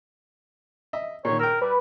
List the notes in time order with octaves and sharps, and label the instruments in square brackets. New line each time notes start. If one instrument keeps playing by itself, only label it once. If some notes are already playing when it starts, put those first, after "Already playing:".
[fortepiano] D#5 E5
[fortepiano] A#2 D#3 [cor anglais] C#5
[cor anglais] A#4 [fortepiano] G5 E6
[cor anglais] G3 [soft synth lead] B4